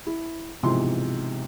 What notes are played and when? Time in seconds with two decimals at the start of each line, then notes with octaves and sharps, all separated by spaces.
0.07 E4
0.63 B1 G#2 C3 E3 F3 C6